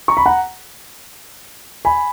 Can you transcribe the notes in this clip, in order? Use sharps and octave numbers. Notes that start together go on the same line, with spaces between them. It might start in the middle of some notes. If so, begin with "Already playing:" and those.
A#5 C#6
B5
F#5 A#5
G#5 B5